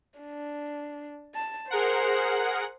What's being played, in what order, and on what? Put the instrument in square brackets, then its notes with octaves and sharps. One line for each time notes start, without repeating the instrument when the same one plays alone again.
[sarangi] D4
A5
[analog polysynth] G#4 A#4 F#5 [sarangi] C5